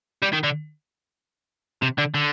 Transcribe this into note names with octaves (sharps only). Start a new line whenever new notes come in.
G3
D#3
D3
C3
D3
D3